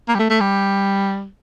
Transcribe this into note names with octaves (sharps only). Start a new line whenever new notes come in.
A#3
G3
A3
A3
G3